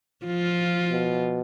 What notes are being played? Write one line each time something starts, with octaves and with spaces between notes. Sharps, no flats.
F3 F4
B2